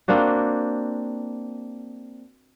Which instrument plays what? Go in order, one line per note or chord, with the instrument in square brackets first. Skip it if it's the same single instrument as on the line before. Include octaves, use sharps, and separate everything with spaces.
[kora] A#3 C4 D4 F#4